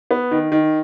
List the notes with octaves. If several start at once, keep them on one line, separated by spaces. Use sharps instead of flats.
B3
D#3
D#3